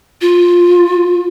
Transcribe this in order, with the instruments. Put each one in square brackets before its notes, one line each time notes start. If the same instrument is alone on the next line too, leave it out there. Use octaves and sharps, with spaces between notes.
[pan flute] F4